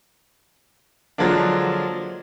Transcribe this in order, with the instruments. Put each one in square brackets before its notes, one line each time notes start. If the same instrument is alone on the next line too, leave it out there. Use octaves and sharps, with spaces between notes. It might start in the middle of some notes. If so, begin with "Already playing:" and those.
[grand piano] D3 F3 F#3 G#3 A#3 D4